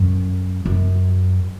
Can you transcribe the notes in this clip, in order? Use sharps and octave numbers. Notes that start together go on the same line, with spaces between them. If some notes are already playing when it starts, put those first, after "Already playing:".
Already playing: F#2
F#2